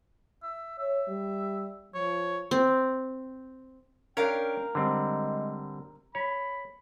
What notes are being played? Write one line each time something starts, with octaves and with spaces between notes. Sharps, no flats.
E5
C#5 E5
G3
F3 C#5
C4
C#4 D4 A#4 F5 G5
D3 G3 G#3 C4
C#5 B5